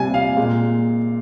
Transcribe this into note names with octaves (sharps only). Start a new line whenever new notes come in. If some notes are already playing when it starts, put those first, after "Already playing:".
Already playing: C3 G3 G#5
F5
A#2 G#3